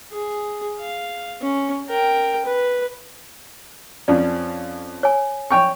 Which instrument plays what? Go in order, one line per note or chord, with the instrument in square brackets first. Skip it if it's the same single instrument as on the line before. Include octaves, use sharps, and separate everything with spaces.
[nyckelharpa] G#4
F5
C#4
A#4 G5
B4
[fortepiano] F2 F3 C#4 [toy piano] D5
[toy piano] C#5 G#5
[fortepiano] C#5 G5 C#6